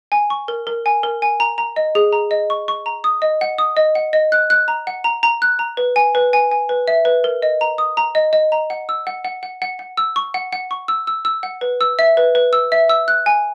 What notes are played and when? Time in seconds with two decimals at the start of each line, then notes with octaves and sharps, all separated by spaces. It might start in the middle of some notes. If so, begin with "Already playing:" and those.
0.12 G#5
0.30 C#6
0.48 A#4
0.67 A#4
0.86 G#5
1.03 A#4
1.22 G#5
1.40 A#5
1.58 A#5
1.76 D#5
1.95 G#4
2.13 A#5
2.31 D#5
2.50 C#6
2.68 C#6
2.86 A#5
3.04 D#6
3.22 D#5
3.41 F#5
3.58 D#6
3.77 D#5
3.95 F#5
4.13 D#5
4.32 F#6
4.50 F#6
4.68 A#5
4.87 F#5
5.04 A#5
5.23 A#5
5.42 F#6
5.59 A#5
5.77 B4
5.96 G#5
6.15 B4
6.33 G#5
6.52 G#5
6.69 B4
6.88 E5
7.05 B4
7.24 A#4
7.42 D#5
7.61 A#5
7.78 D#6
7.97 A#5
8.15 D#5
8.33 D#5
8.52 A#5
8.70 F#5
8.89 E6
9.07 F#5
9.25 F#5
9.43 F#5
9.62 F#5
9.79 F#5
9.97 E6
10.16 C#6
10.34 F#5
10.52 F#5
10.71 C#6
10.88 E6
11.07 E6
11.25 E6
11.43 F#5
11.61 B4
11.81 E6
11.99 E5
12.17 B4
12.35 B4
12.53 E6
12.72 E5
12.89 E6
13.08 F#6
13.26 G#5